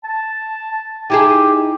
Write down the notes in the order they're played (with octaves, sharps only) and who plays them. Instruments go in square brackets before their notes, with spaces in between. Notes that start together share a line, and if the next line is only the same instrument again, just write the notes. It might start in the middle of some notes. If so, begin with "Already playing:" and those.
[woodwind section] A5
[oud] D#4 E4 G#4 [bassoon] G4